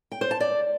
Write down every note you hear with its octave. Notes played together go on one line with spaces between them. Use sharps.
G5
C5
A5
D5